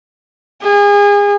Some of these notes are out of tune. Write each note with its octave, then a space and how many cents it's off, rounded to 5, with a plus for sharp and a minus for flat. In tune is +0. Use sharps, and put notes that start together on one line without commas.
G#4 -30